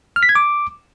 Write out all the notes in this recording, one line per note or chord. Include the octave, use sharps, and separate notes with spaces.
F6
B6
G#6
D6